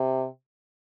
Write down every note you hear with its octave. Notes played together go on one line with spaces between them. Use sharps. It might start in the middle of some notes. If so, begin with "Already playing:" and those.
Already playing: C3